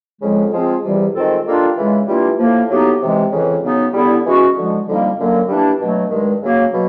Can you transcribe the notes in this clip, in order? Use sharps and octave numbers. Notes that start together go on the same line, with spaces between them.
F2 C#3 F3 G#3
F3 G#3 C4 F4 G#4
E2 C3 E3 G3
D#3 G#3 C4 F4 A4
G3 A#3 D4 F4 A4
C#3 E3 G#3
E3 G3 A#3 D4 F4
A2 F3 A#3
A2 F#3 B3 D#4 G4
C3 E3 G#3
F2 C#3 E3
C#3 F#3 B3 D#4
D3 G3 B3 E4
E3 G#3 C#4 F#4
D3 F3 G#3
F2 D3 G3 A#3 D#4
F#2 D3 F#3 A#3
E3 G3 A#3 D4
B2 F#3 A3
G2 D#3 G#3
C#3 F#3 A#3
B2 F#3